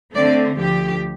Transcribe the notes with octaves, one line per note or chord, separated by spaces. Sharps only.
D3 A3 C4 D5
D2 D3 F3 G4